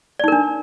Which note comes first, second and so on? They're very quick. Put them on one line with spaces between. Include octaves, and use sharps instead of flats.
D5 D#4 A#4 D4